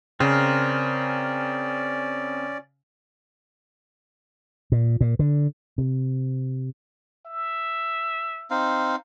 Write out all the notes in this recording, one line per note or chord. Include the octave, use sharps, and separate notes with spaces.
C#3 C4 C#4 A#4 D5
A#2
A#2
D3
C3
E5
C4 D#4 F5